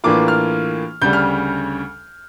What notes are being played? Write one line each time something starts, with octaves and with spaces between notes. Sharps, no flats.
A2 E3 A#3 D4 F4 D6
F6
D2 C#3 G3 G6
F6